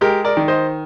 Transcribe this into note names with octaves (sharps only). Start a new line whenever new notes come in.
G#3 G4 A#4
A#4 D5
D#3
C5 D#5